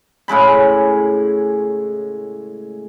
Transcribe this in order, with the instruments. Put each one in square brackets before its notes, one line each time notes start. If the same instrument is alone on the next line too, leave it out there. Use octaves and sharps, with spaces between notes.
[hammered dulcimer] A2 C#3 G#3 B5